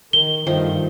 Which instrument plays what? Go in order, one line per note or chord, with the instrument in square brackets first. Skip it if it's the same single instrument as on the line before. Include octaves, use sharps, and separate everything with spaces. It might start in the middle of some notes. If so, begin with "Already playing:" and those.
[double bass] D#3 [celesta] G7
[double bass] G2 [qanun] D#3 F3 A3